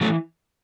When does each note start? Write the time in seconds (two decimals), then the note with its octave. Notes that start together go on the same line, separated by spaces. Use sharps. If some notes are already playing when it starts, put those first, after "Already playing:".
0.01 E3 F#3 A3